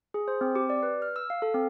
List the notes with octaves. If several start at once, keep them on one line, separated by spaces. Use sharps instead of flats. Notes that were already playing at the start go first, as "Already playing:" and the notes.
G#4
C5
C4
G4
D5
B4
F6
E6
F5
A4
C4